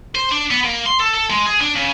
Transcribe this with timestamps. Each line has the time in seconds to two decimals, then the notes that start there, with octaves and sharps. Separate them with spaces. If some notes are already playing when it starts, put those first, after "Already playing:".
0.15 C5
0.32 D4
0.51 B3
0.64 A#3
0.86 C6
1.00 A4
1.14 A4
1.30 G#3
1.47 G#4
1.61 D4
1.75 C#3